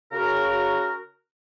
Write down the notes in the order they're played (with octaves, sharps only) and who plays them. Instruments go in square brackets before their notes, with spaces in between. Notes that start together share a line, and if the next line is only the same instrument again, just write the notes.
[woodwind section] C#3 F#4 A#4